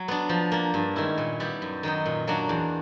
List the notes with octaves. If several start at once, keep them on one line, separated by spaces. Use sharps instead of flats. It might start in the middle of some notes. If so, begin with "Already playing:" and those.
Already playing: F#3
B3 D4
F3
A#3 D4
G2
D#3 G#3 C#4 E4
A#2
G3 B3 E4 G4
F#2
D#3 F#3 B3 D#4
A#2
F#3 A#3 D4 F#4
E2